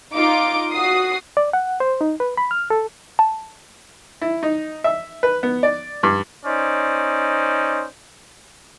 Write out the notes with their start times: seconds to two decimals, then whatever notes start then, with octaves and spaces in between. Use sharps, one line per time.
0.14 D#4 F4 D6 D7
0.72 F#4 D#6 C7
1.37 D5
1.53 F#5
1.80 C5
2.01 D#4
2.20 B4
2.37 B5
2.51 F6
2.70 A4
3.19 A5
4.21 E4
4.43 D#4
4.84 E5
5.23 B4
5.43 B3
5.63 D5
6.03 G2
6.46 C#4 D#4 C5 D5